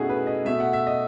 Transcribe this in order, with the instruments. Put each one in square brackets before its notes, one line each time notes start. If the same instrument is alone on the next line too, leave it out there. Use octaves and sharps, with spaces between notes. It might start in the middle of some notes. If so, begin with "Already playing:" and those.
Already playing: [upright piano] B2 A3 C#4 D#4 E4 F#4 G#4
B4
D#5
B2 A3 E5
F#5
E5
D#5